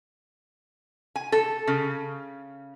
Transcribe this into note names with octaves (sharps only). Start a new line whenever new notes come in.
G#5
A4
C#3